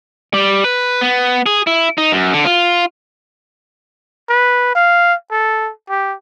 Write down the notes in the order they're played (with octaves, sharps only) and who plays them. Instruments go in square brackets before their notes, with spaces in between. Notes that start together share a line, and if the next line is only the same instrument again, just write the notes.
[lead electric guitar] G3
B4
B3
G#4
E4
D#4
F#2
D3
F4
[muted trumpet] B4
F5
A4
G4